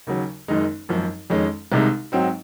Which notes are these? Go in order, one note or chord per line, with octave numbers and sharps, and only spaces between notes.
D#2 C#3 F#3
F#1 F#2 D#3 G#3 D#4
G#1 F#2 F3
F2 D#3 G#3 C#4
C2 C3 D#3 G#3 D#4
G#2 F#3 C4 D#4